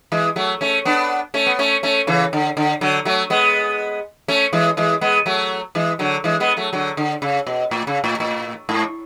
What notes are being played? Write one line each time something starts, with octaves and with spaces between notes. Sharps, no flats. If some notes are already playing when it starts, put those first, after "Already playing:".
E3 G#3
F#3 A3
A3 C#4
B3 D4
A3 C#4
B3
A3 C#4
A3 C#4
C#3 E3
D3
D3
D3 F#3
F#3 A3
G#3 B3
A3 C#4
E3 G#3
E3 G#3
G#3 B3
F#3 A3
E3 G#3
D3 F#3
E3 G#3
G#3 B3
F#3 A3
D3 F#3
D3
C#3
B2
A2
C#3
A2
A2
G#2